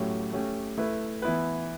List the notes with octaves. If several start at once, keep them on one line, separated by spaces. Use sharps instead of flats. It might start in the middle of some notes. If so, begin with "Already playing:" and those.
Already playing: A2 F#3 A3 C#4 G4
A3 C#4 G4
A3 E4 B4
E3 B3 E4 B4